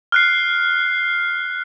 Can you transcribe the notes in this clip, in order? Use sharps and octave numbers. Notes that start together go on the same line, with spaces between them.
F6 F#6 C7